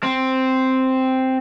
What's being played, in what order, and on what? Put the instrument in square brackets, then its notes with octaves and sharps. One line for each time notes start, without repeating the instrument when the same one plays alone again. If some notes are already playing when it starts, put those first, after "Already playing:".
[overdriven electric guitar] C4